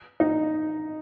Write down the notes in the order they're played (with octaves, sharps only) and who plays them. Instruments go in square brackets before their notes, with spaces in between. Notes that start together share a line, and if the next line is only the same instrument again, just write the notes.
[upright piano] D#4